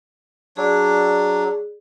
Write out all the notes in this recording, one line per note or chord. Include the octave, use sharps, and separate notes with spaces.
F#3 D4 G#4 D5